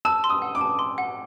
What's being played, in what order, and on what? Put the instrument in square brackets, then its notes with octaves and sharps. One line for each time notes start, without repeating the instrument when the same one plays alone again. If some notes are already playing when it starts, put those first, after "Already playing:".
[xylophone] A5 [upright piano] E6
[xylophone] C6
[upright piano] D#6
[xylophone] F#5
[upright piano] D6
[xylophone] A5
C6
F#5